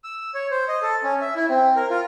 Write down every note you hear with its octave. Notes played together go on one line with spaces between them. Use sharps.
E6
C#5
C5
D#5
A4
C#4
E5
E4
C4
A#4
F4